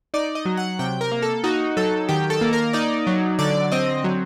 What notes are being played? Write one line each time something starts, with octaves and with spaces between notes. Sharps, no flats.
D#4 D5
D#5
F#3
F#5
C3 G5
A#4
A#3
A4
D#4 F#4
F#3 A4
D#3 G4
A4
A#3
A#4
D#4 D5
F#3
D3 D5
C4 D#5
F#3